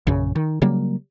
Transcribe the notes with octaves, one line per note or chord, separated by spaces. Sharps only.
A#1 F#2 C#3
D#3
C#3 F#3 G3 A#3